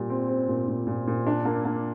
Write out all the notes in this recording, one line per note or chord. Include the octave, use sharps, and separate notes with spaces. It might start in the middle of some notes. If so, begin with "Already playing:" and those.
Already playing: A#2 G3
C4
C4
A#2
A#2
A#2
A#2
D4
A#3
A#3